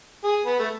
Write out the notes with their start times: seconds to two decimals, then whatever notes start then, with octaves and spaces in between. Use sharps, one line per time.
0.24 G#4
0.46 B3
0.59 A3